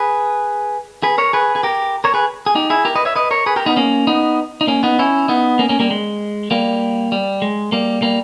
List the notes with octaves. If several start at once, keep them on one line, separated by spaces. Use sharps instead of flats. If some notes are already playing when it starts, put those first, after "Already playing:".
Already playing: G#4 B4
G#4 B4
A#4 C#5
G#4 B4
G#4
G4 A#4
A#4 C#5
G#4 B4
G#4
D#4 G4
E4 G#4
G4 A#4
B4 D#5
C#5 E5
B4 D#5
A#4 C#5
G#4 B4
G4 A#4
B3 D#4
A#3 C#4
B3 D#4
D#4
A#3 C#4
B3 D#4
C#4 E4
B3 D#4
A#3 C#4
A#3 C#4
G3 A#3
G#3
G3 A#3
G3
G#3
G3 A#3
G3 A#3